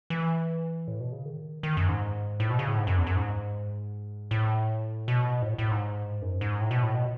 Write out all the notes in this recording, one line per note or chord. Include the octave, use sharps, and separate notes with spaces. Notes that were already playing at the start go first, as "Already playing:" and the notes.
E3
A2
B2
C#3
D#3
D#3
F#2
G#2
A2
B2
C#3
A2
G#2
F#2
E2
F#2
G#2
A2
B2
G#2
A2
A2
G#2
F#2
G#2
A2
B2
A2
B2